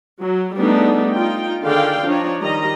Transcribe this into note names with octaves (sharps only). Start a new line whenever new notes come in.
F#3
G3 A3 B3 D4 D#4 G#4
D#4 F4 G5
D3 D#3 G#4 D5 F5 G5
F3 D4 D#4 C#5
D#3 G3 D#5 A#5